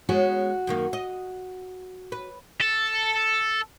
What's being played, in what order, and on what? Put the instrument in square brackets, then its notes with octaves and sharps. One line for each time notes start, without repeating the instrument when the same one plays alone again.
[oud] G#3 B3 C#4 [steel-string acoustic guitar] F#4
[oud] F#2 D#3 A#3
D#5
B4
[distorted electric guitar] A4